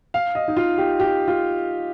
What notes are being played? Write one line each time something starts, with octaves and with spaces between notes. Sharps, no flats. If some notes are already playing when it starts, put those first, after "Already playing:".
F5
D#5
D#4
F4
G4
G4
F4